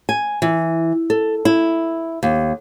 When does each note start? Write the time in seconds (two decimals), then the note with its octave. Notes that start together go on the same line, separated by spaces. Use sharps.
0.09 G#5
0.42 E3
1.10 A4
1.45 E4
2.23 D#2